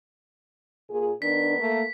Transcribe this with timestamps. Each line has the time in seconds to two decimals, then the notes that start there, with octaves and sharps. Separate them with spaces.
0.90 A#2 G#4
1.22 D#3 B3 D4 B6
1.59 A3 A#3